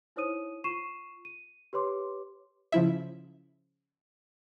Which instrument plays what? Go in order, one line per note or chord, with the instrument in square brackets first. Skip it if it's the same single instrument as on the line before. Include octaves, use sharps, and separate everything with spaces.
[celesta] D#4 E4 C5 C#5 D#6 D#7
F4 C#6 C7 D#7 E7
D#7
G4 B4 C#5 C6 D6
[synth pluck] C#3 F3 E4 E5